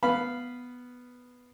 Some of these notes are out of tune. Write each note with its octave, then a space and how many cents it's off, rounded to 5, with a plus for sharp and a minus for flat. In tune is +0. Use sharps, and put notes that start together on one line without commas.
B3 +0 F5 -5 B5 +0